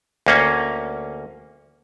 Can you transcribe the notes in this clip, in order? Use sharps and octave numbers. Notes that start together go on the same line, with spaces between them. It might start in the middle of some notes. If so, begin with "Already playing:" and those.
D2 A#3 C#4